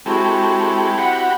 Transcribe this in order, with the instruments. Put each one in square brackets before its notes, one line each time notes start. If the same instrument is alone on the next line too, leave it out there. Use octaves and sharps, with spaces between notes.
[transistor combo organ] G#3 G4 A4 [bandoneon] C4 E4 [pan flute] F#4
[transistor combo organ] F#4 G4 B5 [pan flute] F#5